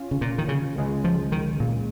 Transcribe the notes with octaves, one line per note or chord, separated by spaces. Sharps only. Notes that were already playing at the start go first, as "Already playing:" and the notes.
Already playing: C#4 F4
C#3
A#2
D#3
C#3
C#2 C#3 G#3
F3
D#3
A#2